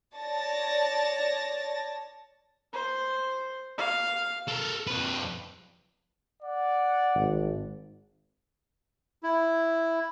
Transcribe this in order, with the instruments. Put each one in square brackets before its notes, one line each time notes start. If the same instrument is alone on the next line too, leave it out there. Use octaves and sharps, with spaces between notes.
[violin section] C#5 D5 A5 A6 A#6
[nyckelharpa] C5
F5
[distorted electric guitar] A4 A#4
F2 B4
[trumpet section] D5 F#5
[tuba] G#1
[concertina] E4